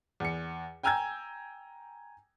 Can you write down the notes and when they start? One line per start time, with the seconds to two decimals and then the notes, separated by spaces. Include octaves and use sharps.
0.20 E2 C#7
0.83 G5 G#5 A#5 E6 G6 G#6